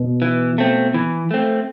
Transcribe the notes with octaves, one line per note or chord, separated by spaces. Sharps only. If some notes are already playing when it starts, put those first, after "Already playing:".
Already playing: B2
E3
A3 C4
E3
A3 C4